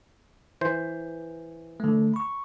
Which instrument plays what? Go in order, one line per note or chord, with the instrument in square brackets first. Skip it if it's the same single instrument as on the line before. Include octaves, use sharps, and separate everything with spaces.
[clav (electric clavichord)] E3 C5
[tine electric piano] D3 A3
B5 C#6